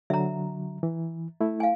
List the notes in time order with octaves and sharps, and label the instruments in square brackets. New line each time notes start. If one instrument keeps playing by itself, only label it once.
[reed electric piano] D3 F#3 [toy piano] E5 A#5
[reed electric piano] E3
A3 E4
[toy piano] F5 G#5